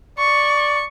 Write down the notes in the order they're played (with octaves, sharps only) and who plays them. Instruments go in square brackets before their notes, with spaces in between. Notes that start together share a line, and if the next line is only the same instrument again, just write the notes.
[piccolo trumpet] D5 [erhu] C#6